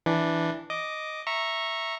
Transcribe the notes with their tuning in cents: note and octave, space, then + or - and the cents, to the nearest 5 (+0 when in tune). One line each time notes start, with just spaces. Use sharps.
E3 +0 D4 +0
D#5 +0 D6 +0
E5 +0 A#5 +0 C#6 -15